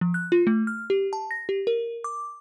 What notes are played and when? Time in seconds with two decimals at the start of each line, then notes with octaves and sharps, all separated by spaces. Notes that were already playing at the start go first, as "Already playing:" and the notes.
0.01 F3
0.14 F#6
0.32 F4
0.47 A3
0.67 F6
0.90 G4
1.13 A5
1.31 A#6
1.49 G4
1.67 A#4
2.04 D6